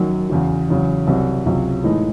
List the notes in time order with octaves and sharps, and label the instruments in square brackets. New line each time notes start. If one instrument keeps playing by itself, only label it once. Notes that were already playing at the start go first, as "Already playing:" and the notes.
Already playing: [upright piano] F#2 D#3 F#3
E2 C#3 F#3
E2 C#3 F#3
C2 C3 F#3
C#2 C3 F#3
A2 E3 G#3 D#4